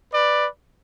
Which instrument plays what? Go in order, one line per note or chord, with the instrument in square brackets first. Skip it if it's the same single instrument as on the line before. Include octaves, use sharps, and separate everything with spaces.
[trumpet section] B4 D5